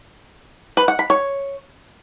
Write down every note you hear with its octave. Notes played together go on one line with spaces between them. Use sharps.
B4
F#5
B5
C#5